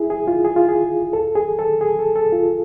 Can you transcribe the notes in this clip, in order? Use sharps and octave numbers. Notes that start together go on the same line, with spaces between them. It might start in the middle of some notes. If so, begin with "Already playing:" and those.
Already playing: E4 G#4
G#4
F4
G#4
F4
G#4
A4
G#4
A4
G#4
A4
A4
F4